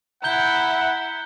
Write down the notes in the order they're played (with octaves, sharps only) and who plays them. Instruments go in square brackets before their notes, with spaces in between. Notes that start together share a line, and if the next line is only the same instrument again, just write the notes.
[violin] E4 [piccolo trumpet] F#5 [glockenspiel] A#5 G6 G7